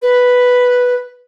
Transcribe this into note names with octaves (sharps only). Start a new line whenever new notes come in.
B4